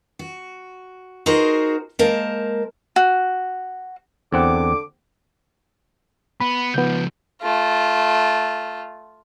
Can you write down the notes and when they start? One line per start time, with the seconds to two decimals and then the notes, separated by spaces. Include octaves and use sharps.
0.19 F#4
1.26 D#4 F#4 G#4 A#4 C5
1.99 G#3 A#3 A#4 C5 A5
2.96 F#4
4.33 E2 D3 C4 F#5 D6
6.40 B3 B5
6.74 C#2 F3 B3 G6
7.42 A3 F4